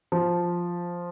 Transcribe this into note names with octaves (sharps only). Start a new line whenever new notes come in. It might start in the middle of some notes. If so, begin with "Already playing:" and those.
F3